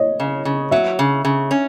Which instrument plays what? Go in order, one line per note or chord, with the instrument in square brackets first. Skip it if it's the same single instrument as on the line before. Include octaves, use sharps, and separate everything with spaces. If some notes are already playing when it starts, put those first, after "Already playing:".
Already playing: [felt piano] C#5 D#5
[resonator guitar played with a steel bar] C#3
C#3
[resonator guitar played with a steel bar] F#3 [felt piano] E5
[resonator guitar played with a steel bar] C#3
C#3
C#4